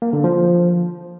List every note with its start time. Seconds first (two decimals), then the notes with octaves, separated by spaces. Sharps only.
0.02 A#3
0.13 D3
0.24 F3